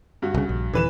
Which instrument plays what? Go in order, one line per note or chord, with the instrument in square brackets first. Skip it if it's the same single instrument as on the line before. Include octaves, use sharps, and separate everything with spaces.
[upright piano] G2 F#4
[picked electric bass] C2 C#3
A#1
[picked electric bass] D#1 [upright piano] E3 B4 E7